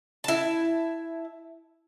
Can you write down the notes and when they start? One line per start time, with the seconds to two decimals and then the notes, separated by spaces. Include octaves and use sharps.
0.24 E4 A5